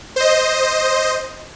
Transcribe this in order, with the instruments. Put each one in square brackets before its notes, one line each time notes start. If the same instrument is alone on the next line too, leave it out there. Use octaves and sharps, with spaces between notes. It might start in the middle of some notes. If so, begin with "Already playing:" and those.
[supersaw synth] C5 D#5